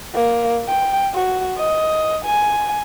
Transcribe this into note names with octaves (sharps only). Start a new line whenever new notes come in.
A#3
G5
F#4
D#5
G#5